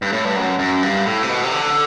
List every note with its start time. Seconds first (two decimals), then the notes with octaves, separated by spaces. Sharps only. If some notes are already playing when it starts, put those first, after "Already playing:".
0.02 G2
0.13 A2
0.25 G2
0.36 F#2
0.59 F#2
0.83 G2
1.05 A2
1.23 C3
1.29 B2
1.44 C3
1.52 D3